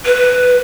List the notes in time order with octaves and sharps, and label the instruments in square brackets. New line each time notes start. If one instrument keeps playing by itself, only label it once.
[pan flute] B4